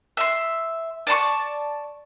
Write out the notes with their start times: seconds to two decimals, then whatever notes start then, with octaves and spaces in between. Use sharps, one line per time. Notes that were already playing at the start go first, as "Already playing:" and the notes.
0.17 E5 C6
1.07 D5 A5 C6 C#6